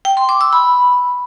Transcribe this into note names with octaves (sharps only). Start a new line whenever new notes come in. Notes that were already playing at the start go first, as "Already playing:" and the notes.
G5
C6
D6
E6
B5